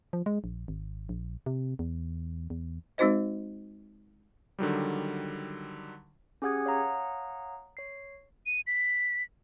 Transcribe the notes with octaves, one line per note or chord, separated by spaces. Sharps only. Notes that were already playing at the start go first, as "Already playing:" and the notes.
F3
G#3
A#1
G#1
A#1
C3
E2
E2
G#3 C4 D#4 F#4 C5 D#5
D3 D#3 F#3 G3
C#4 G4 G#4 F#5 D#6 G#6
C#5 F5 F#5 A#5 D#6
C#5 C7
D#7
B6